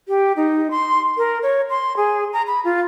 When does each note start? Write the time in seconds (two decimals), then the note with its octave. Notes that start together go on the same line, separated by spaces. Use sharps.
0.08 G4
0.36 D#4
0.71 C6
1.18 A#4
1.43 C#5
1.70 C6
1.97 G#4
2.33 A#5
2.47 B5
2.65 F4